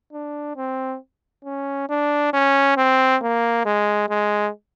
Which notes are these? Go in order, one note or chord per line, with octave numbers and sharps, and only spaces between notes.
D4
C4
C#4
D4
C#4
C4
A#3
G#3
G#3